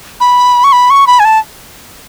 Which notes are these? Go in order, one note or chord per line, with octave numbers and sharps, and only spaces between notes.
B5
C#6
B5
C#6
B5
G#5
A5